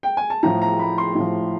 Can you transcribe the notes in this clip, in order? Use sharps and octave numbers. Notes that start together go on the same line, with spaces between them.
G5
G#5
A5
A2 F3 A#5
A#5
B5
C6
A2 F3